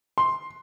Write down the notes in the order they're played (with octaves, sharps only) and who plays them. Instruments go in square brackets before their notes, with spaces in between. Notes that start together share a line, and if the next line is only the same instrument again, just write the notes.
[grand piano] C6